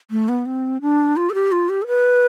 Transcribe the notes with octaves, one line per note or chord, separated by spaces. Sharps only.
A3
B3
C4
D4
F4
A4
G4
F4
G4
A4
B4